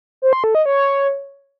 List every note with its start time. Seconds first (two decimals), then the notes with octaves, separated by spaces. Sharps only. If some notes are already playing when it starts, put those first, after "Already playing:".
0.22 C5
0.33 C6
0.44 A4
0.55 D#5
0.66 C#5